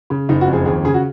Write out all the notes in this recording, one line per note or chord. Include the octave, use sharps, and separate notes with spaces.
C#3
F#1 D#4
F#4
F2
G#4
D#2 G#4
C#3 G#4
F#4